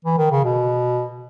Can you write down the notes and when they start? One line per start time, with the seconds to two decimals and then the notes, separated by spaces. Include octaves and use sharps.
0.05 E3
0.18 D#3
0.31 C#3
0.44 B2